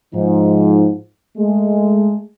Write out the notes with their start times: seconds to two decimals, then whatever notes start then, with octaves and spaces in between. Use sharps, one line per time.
0.14 G#2 F3 D#4
1.37 G#3 A3